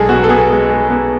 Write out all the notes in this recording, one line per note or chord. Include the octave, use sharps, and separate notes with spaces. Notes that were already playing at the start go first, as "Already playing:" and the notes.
Already playing: B1 G#3 G#4 A4
B3 F#4
A4
B3 G#4
G#3
G#3
B3